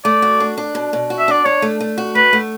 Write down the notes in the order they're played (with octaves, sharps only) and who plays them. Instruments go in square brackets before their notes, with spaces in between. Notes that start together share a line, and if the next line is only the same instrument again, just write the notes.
[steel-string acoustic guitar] A3 [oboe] D5
[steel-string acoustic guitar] F#4
D4
D4
B2
B2
F#4
[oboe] E5
[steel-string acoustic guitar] D4 [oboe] D5
[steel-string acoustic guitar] D4 [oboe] C#5
[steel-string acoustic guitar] A3
A3
F#4
[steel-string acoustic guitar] A3 [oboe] B4
[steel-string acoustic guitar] A3